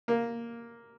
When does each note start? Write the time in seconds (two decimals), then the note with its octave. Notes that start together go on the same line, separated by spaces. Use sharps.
0.08 A#3